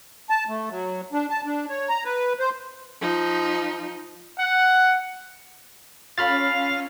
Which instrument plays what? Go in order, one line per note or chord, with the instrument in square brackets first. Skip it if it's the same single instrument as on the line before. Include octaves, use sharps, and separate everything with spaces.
[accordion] A5
A3
F#3
D4
A5
D4
C#5
A#5
B4
C5
[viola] F3 D#4
[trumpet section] F#5
[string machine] C#4 [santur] F4 A4 C#5 [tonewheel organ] F5 [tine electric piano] B5 F6 A6